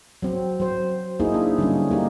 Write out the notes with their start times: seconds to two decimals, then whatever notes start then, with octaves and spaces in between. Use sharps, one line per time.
0.22 F#3 C4
0.60 F#3 C5
1.20 A#3 D#4 E4 G#4
1.34 D4
1.58 D3 G3 C#4
1.91 A#3 D#4 G4